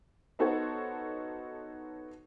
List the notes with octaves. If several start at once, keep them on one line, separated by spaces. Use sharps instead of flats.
B3 D#4 F#4 A4 C5 C#5